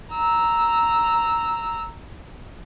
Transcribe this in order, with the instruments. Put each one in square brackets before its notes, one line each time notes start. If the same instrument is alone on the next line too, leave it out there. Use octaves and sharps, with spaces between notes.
[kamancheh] A#5 E6